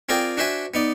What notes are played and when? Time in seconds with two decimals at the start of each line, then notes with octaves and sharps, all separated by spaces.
0.09 C4 F4 G#4 A#4 D5 G5
0.37 D4 F#4 C5 E5 G#5
0.74 B3 D#4 D5